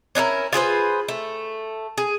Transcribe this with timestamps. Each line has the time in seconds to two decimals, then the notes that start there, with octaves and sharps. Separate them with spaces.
0.15 C#4 D4 E4 A#4
0.53 F4 G#4 B4 C5
1.08 A3
1.98 G#4